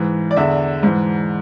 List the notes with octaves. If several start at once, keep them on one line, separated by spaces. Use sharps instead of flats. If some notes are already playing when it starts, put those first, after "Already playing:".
Already playing: G#2 E3
D5
E2 D3 E5
G#2 E3